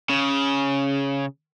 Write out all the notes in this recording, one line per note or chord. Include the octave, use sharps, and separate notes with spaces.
C#3